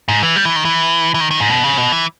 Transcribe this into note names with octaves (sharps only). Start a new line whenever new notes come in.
G#2
E3
G3
E3
D#3
E3
E3
D#3
D#3
G#2
B2
C#3
B2
E3